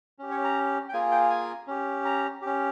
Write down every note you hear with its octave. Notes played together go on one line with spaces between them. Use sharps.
C#4 G4
C#5
A#5
G5
A#3 F4 G#4 G#5
G5
G#5
C#4 G4
A#5
C#4 G4